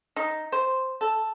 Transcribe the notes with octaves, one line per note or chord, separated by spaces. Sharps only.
D#4
C5
A4